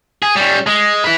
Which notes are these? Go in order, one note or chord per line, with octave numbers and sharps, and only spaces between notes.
G#4
G3 C#4
G#3
E4 B4